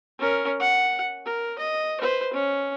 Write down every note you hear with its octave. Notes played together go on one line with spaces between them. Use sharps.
C#4 A#4
F#5
A#4
D#5
B4 C5
C#4